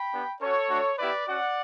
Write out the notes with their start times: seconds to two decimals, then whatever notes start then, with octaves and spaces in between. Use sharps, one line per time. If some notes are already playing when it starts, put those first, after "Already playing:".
Already playing: G5 B5
0.13 B3 D4 G4
0.41 C#4 F#4 A4 C#5
0.70 A3 D4 F#4
0.98 B3 E4 G4 B4 D5
1.27 C#4 F#4 D5 F#5